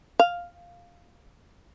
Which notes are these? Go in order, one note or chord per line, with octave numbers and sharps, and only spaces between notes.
F5